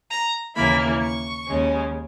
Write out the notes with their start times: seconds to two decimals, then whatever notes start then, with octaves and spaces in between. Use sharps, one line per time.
0.10 A#5
0.56 D#2 C#3 E3 A#3 E4 B5
1.01 C#6
1.47 D#2 C#3 G#3 C#4